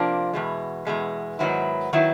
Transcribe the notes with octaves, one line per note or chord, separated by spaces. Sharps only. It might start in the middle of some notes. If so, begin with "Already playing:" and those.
Already playing: C3 F3 A#3 D4
E2 B2 G#3
E2 B2 G#3
G#2 D#3 F#3 B3 E4
D#3 F#3 B3 E4